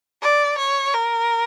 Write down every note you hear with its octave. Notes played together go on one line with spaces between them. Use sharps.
D5
C#5
A#4